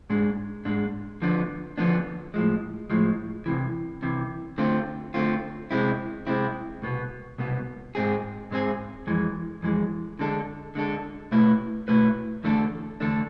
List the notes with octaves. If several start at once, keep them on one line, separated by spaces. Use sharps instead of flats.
G#2 G#3 D4
G#2 G#3 D4
D3 F3 B3 D4
D3 F3 B3 D4
A2 F3 G#3
A2 F3 G#3
C2 C3 E3
C2 C3 E3
D3 A3 C4 F4
D3 A3 C4 F4
C3 G#3 C4 E4
C3 G#3 C4 E4
C2 B2 B3
C2 B2 B3
G#2 G#3 C4 G#4
G#2 G#3 C4 G#4
F2 E3 G#3
F2 E3 G#3
D3 G#3 D4 A4
D3 G#3 D4 A4
B2 A3 E4 B4
B2 A3 E4 B4
E2 D3 A3 D4 A4
E2 D3 A3 D4 A4